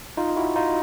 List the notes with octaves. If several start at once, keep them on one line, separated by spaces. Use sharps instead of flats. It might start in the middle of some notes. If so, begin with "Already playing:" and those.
D#4 F4
E4 F#4
D#4 F4